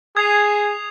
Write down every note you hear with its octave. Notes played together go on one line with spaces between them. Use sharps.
G#4 D#6 G#6 C7 F7